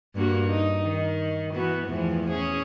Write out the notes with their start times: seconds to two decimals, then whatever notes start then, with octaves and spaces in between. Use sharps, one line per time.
0.15 G2 A#3 F#4
0.49 D#4
0.82 D#3
1.53 E3 B3 F#4
1.86 E2 A2 F3
2.30 C#4 G#4